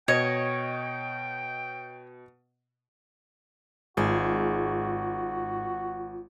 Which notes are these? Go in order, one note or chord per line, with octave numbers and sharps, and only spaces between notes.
B2 C#5 D#5 G5 G#6
G#1 G#2 F4 F#4 G#4